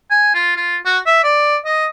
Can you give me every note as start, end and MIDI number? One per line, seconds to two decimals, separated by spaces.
0.10 0.31 80
0.34 0.54 65
0.56 0.76 65
0.85 0.98 66
1.06 1.22 76
1.23 1.56 74
1.65 1.85 75